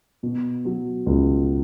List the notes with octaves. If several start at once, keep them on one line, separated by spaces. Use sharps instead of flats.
B2
F#3
C#2